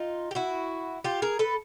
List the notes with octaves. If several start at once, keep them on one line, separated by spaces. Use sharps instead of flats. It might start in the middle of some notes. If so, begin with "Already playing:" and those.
Already playing: D#4 F4
G4
E4 F#4
F4 G4
G#4 A#4
A4 B4